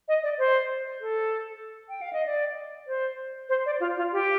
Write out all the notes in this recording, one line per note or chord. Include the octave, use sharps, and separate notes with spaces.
D#5
D5
C5
A4
G5
F5
D#5
D5
C5
C5
D5
F4
F4
G4